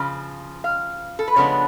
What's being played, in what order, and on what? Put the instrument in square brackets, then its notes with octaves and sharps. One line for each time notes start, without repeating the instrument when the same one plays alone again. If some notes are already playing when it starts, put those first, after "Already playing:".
Already playing: [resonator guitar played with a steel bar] C#3 F3
F5
A4
B4
C#3 F3 G#3 B3 D4 C#5